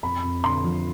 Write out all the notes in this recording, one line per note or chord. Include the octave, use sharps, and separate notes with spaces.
F2 B5
F2
D3 C6
F3